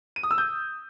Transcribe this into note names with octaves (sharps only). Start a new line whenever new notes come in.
D#7
D#6
E6
G6